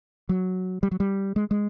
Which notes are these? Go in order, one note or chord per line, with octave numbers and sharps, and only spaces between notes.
F#3
G3
F#3
G3
G#3
G#3